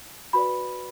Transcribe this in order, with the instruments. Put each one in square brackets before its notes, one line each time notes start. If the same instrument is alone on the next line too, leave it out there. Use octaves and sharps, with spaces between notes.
[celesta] F#4 B4 D5 B5